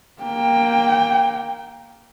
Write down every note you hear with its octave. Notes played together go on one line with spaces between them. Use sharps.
A#3 G5